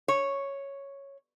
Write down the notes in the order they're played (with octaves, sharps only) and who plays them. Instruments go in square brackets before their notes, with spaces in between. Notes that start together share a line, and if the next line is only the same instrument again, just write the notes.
[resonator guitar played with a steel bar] C#5